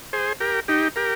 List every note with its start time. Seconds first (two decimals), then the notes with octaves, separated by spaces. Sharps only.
0.13 G#4 C5
0.40 G4 A#4
0.68 D#4 G4
0.96 G4 A#4